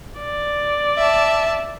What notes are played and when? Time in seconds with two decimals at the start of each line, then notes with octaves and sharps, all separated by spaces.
0.19 D5
0.98 E5 A5